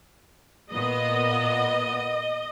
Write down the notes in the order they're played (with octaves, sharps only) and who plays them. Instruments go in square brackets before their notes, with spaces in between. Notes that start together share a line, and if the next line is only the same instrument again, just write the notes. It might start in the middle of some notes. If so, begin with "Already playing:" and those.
[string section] A#2 B3 [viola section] D#5